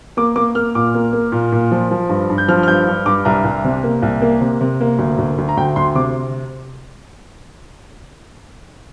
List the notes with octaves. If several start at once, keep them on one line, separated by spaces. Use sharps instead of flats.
A#3 D6
A#3 D6
A#3 F6
A#2 D6
A#3
A#3
A#2
A#2
F3
F3
G2
G2
G6
F3 F6
F6
G2 G6
G2
G2 D6
C2 A#5
C2
C3
A#3
C2
A#3
C3
C3
A#3
D2
D2
D2
A#5
D2 G5
D2 C6
C3 D6